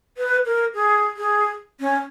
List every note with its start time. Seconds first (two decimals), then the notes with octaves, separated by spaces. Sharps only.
0.17 B4
0.45 A#4
0.74 G#4
1.17 G#4
1.80 C#4